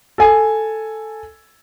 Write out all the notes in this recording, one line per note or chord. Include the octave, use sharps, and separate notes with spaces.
A4 G#5